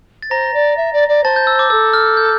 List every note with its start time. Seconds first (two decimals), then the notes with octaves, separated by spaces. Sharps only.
0.22 A6
0.30 C5 A#5 A#6
0.54 D5
0.77 E5
0.93 D5
1.08 D5
1.24 C5 A5 A6
1.36 G6
1.47 E6
1.59 D6
1.70 A4 E6
1.93 F6
2.17 G6